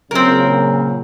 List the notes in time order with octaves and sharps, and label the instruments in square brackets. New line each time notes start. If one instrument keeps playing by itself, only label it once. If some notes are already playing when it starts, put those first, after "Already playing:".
[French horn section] A#2 C#3 F#3 [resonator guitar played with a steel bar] C4 A#4